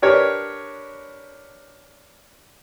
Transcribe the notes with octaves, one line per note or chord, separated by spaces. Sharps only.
D4 G4 A#4 B4 C#5